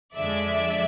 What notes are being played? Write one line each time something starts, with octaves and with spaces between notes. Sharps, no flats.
F2 D3 F3 G#3 D5 E5